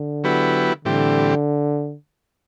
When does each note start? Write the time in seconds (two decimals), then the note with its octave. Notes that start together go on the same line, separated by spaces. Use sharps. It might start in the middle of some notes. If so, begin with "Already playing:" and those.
Already playing: D3
0.24 F#3 B3 E4 G4 B4
0.85 A2 D3 E3 G3 C4 G4